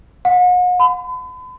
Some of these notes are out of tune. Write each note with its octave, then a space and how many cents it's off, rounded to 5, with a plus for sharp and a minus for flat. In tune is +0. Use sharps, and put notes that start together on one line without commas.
F#5 -40
B5 +45